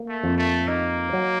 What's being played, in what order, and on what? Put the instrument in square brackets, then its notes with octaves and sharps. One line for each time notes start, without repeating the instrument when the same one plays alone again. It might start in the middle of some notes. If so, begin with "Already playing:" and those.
Already playing: [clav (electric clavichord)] A#3
[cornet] A3
[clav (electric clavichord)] F2
[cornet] A3
[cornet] A#3 [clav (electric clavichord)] D#4
[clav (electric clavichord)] F#3